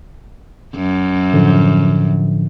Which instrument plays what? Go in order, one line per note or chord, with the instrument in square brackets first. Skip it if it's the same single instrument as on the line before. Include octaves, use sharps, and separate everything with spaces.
[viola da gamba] F#2
[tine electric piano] A2 D3 F3